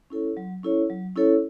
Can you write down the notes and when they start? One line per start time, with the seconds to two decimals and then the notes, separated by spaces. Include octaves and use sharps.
0.10 C#4 E4 A4 C#5
0.37 F#3
0.63 C#4 E4 A4 C#5
0.90 F#3
1.16 C#4 E4 A4 C#5